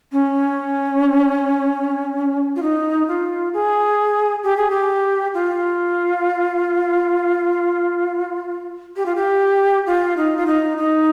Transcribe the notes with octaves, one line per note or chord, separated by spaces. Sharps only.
C#4
F4
D#4
F4
G#4
G4
G#4
G4
F4
G4
F4
G4
F4
D#4
F4
D#4
D#4